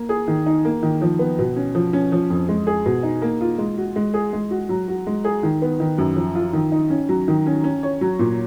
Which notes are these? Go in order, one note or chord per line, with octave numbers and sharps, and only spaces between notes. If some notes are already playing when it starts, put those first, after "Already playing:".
Already playing: A#3
G#4
D#3
D#4
A#3
D#3
F3
B3
B2
C#4
F3
C#4
F3
F2
G#3
G#4
B2
D#4
A#3
F4
G#3
F#4
G#3
G#4
G#3
F#4
F#3
F#4
G#3
G#4
D#3
B3
D#3
F#2
F3
F4
D#3
D#4
C#4
F#3
D#3
C#4
C#4
C#5
F#3
A#2